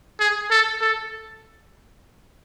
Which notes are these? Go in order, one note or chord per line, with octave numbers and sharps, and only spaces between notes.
G#4
A4
A4